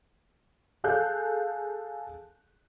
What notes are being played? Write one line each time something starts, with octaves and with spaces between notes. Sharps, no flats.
G#4 A4 F5 F#6 G6